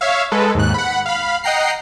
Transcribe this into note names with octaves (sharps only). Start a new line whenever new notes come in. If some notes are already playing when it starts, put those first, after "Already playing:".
C#5 E5 F5
G#3 A4 B4
D#2 G#2 F#6
F#5 B5
F5 B5
D#5 F#5 G5 A#5 C7